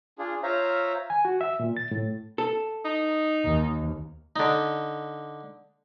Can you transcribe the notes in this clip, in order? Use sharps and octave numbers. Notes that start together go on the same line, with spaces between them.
D4 F4 G#4
F4 C5 C#5 E5 F5 A#5
G#5
F#4
E5
A#2
A6
A2
A4
D#4
D#2
D3 D#4